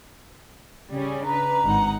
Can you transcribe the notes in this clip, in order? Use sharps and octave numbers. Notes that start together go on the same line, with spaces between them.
C#3 G3 C#4
D4 B4 A#5
G#1 D#4 F#5